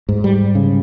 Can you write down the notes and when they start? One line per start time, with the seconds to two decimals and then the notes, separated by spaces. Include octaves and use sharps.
0.09 G#2
0.24 G3
0.55 C#3